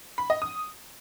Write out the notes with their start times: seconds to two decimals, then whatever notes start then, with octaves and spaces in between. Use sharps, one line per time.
0.18 B5
0.30 D#5
0.42 D#6